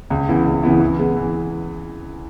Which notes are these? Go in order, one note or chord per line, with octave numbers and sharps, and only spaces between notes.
C#2
C#3 E3 B3 E4
C#2
C#3 E3 B3 E4
E3
G#3 B3
E3